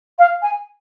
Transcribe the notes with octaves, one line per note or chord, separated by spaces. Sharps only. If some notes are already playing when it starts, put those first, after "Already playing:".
F5
G#5